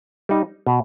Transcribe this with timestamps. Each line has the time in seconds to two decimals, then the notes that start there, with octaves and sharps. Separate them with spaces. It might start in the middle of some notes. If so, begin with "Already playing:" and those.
0.29 G3 D#4
0.67 B2